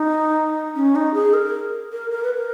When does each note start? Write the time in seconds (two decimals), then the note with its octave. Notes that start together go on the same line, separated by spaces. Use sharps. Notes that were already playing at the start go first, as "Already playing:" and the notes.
Already playing: D#4
0.75 C#4
0.95 D#4
1.14 G#4
1.34 A#4
1.92 A#4
2.11 A#4
2.23 B4
2.35 A#4